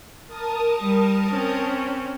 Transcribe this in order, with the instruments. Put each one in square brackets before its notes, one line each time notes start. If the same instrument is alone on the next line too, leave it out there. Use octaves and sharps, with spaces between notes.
[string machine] A#4 A5 D#6
[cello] G3
C4 C#4